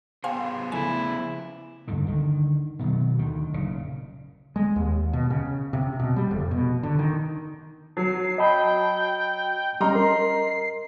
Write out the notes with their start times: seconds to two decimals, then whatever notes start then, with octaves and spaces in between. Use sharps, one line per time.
0.24 B3 G#4 C5 F5 G5 G#5 C6
0.72 C#3 F3 A3 E4 G#5
1.88 C#2 G2 D3 D#3
2.06 D3 D#3
2.79 B2 D#3 F#3
3.18 D2 D#3
3.54 F#1 A#2 C#3
4.56 G#3
4.76 D#2
5.13 B2
5.30 C#3
5.73 C3
6.00 B2
6.16 G3
6.31 F1
6.51 B2
6.83 D3
6.99 D#3
7.97 F#3 C7
8.38 D#5 G5 A5 B5
9.81 G3 C#4 D#5 A#5 C6 F6
9.95 A#4 C7